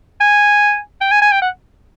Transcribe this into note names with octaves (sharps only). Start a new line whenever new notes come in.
G#5
G5
G#5
G#5
G5
F#5